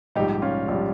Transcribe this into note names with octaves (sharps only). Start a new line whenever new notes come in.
A#1 G#2 G3 D#4 G4
C#4 F4
A#1 G3